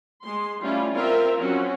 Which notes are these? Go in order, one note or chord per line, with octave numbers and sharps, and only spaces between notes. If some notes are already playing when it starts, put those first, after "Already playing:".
G#3 C6
G3 A3 C#4 E4 F4
C4 F4 A#4 E5 F5 G5
F#3 C4 C#4 F4 F#4